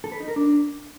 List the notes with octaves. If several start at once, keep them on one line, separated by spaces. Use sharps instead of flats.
A4
B4
D#4
A#4
D4